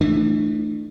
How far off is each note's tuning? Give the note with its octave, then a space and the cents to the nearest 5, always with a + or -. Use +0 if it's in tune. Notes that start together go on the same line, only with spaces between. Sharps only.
E3 +0 A3 +0 D4 +30